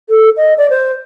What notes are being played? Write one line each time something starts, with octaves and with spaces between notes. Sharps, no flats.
A4
D#5
D5
C5